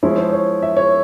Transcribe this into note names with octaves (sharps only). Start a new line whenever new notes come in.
F3 G#3 E4 C#5
C5
C#5
E5
C#5